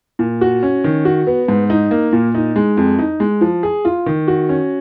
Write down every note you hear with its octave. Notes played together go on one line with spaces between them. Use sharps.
A#2
F#4
C#4
D#3
F#4
B3
G#2
D#4
A#3
A#2
D#4
G#3
F2
D#4
G#3
F3
G#4
F4
D#3
F#4
C#4